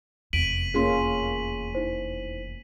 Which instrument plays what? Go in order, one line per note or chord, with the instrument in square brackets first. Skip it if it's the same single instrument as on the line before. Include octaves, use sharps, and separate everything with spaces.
[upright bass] F1 E2 [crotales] B6 D#7 F#7 [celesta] D7
[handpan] A#3 C#4 F4 [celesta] G#4 C6
[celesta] D#4 E4 C5